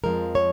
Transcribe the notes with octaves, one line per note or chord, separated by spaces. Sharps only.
F2 F3 G#3 A#4
C#5